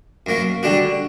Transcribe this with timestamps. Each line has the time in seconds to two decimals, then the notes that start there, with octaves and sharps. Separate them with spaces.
0.26 F#2 F#3 A#3
0.63 D3 G3 D4 F#4